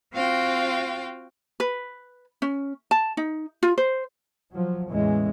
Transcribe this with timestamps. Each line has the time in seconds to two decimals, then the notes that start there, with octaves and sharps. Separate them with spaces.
0.14 C4 F4 F#4 F5 G5
1.60 B4
2.42 C#4
2.91 A5
3.17 D#4
3.63 F4
3.78 C5
4.53 F3 F#3
4.90 E2 A2 E3 G#3 C#4